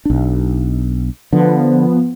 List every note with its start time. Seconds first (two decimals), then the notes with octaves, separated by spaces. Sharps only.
0.05 B1 D4
1.33 D3 F3 B3